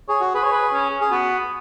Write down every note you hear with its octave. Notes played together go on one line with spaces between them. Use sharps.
G#4 C#5
F#4
G#4 B4
C#5
B4
C#4
G#4
B3 F#4